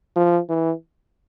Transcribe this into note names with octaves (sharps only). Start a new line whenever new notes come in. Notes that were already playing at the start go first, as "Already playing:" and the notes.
F3
E3